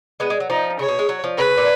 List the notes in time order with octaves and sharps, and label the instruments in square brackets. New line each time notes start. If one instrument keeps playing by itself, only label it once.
[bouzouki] G#3 B3
G#3
F#3
[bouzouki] F3 [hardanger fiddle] D#4
[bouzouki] C#3 [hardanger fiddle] C#5
[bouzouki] B2
G#3
F#3
F3
[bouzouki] C#3 [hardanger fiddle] B4
[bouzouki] A#2